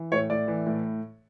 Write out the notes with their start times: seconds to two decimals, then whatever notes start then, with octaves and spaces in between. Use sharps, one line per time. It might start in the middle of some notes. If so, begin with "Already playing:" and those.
Already playing: E3
0.12 A2 C#5
0.30 A2 D5
0.48 E3
0.66 A2